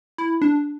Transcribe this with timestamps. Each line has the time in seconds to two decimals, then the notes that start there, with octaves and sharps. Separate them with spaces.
0.18 E4
0.42 D4